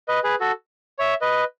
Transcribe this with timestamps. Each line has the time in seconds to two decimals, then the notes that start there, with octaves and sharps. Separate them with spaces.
0.08 B4 D#5
0.24 G#4 B4
0.40 F#4 A4
0.99 C#5 E5
1.21 B4 D#5